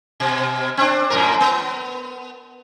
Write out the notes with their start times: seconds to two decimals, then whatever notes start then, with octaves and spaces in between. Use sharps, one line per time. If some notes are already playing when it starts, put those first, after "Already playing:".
0.20 B2
0.77 C4 D4
1.10 F#2 A2 A#4
1.40 B3